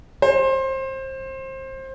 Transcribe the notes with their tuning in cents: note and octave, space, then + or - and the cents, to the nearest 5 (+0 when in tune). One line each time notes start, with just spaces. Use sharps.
C5 +25